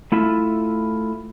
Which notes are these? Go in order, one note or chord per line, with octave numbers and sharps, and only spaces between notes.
A3 E4 F4 E5